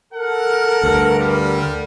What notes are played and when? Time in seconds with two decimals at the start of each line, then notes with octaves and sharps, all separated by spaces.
0.13 A4 A#4 F#5
0.83 D2 G2
1.19 D3 G3